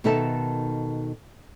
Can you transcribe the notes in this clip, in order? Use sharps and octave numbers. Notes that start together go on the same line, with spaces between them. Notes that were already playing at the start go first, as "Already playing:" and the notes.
B2 D#3 D#4 A4 E5 A5